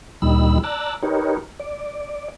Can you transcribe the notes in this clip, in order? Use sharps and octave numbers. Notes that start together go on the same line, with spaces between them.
D2 A#2 G3 D#4 B5 E6
D5 A5 A#5 E6 F#6
D#4 G4 A#4 B4 C#5
D5